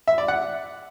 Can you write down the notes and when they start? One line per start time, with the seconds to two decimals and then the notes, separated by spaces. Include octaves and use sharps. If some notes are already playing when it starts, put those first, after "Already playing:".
0.08 E5
0.18 D5
0.28 F#5